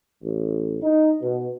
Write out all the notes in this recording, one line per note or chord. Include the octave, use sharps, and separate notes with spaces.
A1
D#4
B2